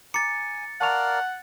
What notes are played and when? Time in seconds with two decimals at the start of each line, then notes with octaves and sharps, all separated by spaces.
0.14 G#5 A#5 D6 A6 C#7
0.81 A#4 D5 F5 F#5 A5 C#6 F7